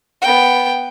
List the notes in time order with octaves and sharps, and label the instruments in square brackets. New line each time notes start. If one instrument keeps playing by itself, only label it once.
[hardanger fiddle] B3 G5